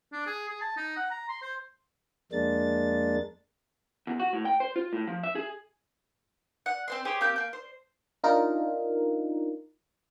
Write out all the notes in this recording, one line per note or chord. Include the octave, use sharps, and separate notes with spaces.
D4
G#4
G#4
A5
D#4
F#5
A#5
C6
C5
F2 G#3 A#3 D4 A6
E2
F#4
A2
G5
C5
F4
A2
F3
E5
G#4
F#5
C4 C5 C6
G4 G#4 C5 C#5
A#3 C4 G4 G6
A#3 G6
C5
D4 D#4 F4 A#4